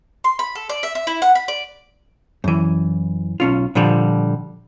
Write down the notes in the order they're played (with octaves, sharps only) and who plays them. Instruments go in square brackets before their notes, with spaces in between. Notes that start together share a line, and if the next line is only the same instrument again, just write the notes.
[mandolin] C6
B5
A4
D5
E5
E5
E4
F#5
B5
D5
[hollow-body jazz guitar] F#2 E3
B1 C#4 F4
A#2 D3 F3 G3